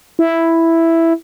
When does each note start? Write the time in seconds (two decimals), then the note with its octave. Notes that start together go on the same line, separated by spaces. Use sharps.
0.19 E4